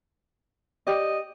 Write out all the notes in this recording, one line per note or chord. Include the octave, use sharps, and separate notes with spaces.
G4 D5 D#5